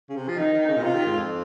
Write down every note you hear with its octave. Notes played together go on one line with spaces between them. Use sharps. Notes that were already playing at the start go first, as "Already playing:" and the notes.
C#3
C3
F3
D#3 D#4
D#3
C#3
A#2
C3 F4
D#3
G#2
F2